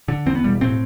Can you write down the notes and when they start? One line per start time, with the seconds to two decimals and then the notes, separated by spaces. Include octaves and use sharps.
0.08 D3
0.26 E2 C4
0.35 B3
0.44 E1 G3
0.61 A2 C4